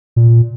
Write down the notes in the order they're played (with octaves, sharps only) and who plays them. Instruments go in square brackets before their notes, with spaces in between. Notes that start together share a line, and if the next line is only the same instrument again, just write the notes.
[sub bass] A#2